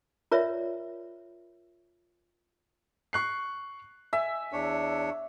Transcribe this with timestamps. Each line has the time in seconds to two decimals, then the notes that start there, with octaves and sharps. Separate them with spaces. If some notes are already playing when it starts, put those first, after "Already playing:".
0.31 F4 A#4 C#5 D5 E5
3.13 C#6 F#6 C7
4.13 E5 G#5
4.52 E2 D4 C#5